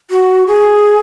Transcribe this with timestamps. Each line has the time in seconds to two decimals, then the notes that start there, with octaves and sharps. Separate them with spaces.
0.10 F#4
0.47 G#4